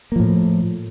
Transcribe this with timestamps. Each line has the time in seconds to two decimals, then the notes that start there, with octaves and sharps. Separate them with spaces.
0.12 A#3
0.16 F3
0.20 A2